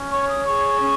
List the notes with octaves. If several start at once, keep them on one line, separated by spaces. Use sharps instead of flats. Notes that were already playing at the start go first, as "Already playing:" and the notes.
Already playing: C#4
C#5 C#6
D#6
G#4 C#6
C#4